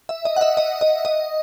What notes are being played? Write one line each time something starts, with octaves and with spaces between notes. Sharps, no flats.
E5
D#5
F#5
E5
D#5
D#5
D#5